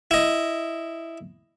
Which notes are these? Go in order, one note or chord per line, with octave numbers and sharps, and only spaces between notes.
E4 D#5